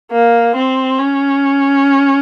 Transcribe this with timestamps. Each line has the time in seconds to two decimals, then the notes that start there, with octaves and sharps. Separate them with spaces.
0.11 A#3
0.56 C4
0.99 C#4